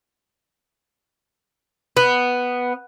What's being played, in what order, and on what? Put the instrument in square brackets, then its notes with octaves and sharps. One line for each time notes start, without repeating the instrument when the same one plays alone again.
[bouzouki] B3